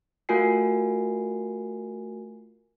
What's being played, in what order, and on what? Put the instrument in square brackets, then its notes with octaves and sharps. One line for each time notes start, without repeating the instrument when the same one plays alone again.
[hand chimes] A3 F4 F#4 A#4 G#5 C7